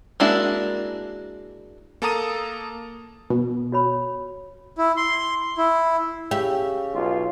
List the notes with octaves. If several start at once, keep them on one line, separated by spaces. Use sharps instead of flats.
G#3 A#3 D4 E4 F#4
A#3 A4 A5 A#5 D#6 D#7
B2
F#4 C#5 B5
E4
C6
E4
C#3 G4 E5
B1 F4